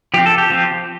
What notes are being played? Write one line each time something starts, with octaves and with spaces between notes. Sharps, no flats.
F3 C4 G4
A4
G4
F3 C4